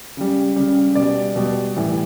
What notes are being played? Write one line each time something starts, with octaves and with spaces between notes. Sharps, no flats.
C#3 G3
C#3 G3
B2 G3 D5
B2 G3
A2 E3 G3